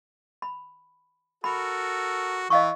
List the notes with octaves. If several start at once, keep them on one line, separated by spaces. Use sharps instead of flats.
B5
F#4 A4 A#4 B5
E3 D#5 F5 C#6